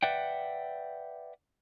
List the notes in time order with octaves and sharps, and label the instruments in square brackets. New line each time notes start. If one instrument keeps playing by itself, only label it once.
[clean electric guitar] B4 D5 E5 F#5 G5